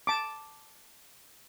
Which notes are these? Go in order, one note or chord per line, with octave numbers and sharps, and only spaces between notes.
A5 D6